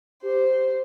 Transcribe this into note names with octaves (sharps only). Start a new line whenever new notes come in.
G4 C5